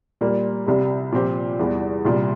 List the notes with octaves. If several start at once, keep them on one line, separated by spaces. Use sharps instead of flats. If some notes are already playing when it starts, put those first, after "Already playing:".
A#2 G3 A#3
C2 C3 G3
A#2 F3 C4 G4
E2 E3 G3
C2 A#2 G3